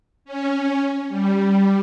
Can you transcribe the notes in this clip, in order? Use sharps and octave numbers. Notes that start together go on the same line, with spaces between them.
C#4
G3